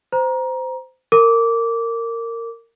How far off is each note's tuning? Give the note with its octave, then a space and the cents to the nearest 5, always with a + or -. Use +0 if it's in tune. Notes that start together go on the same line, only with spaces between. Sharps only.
C5 -20 A#5 +20
A#4 -20 D6 -15